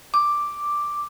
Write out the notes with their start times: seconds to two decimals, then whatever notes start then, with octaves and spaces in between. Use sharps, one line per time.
0.14 D6